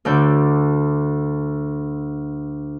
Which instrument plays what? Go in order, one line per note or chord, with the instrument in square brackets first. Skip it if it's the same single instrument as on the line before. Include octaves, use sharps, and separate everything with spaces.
[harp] D2 D3 G6